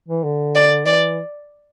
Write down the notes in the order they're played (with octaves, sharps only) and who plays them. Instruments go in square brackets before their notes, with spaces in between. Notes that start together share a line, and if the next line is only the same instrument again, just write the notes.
[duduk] E3
D3
[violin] D5
[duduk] E3 [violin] D5